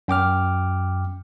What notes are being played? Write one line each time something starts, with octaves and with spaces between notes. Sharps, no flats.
F#2 G5 D6 F6